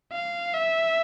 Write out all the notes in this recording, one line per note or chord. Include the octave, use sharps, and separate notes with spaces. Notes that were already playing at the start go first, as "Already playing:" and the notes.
F5
E5